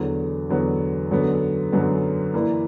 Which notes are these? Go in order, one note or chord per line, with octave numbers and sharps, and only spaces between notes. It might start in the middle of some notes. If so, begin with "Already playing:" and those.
Already playing: E2 D3 F#3 B3
E2 D3 F#3 B3
F#2 D3 F#3 B3
F#2 D3 F#3 B3
E3 A#3 E4 B4 D5